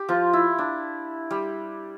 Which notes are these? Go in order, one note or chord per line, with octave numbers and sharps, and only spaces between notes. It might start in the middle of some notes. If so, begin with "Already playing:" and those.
Already playing: G4
F3 F4
E4
D4
G3